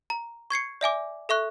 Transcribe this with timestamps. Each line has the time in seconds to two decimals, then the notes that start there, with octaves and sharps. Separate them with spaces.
0.10 A#5
0.50 C#6 G#6 C7 C#7
0.81 D5 E5 G#5 D6
1.29 A4 E5 C#6 F#6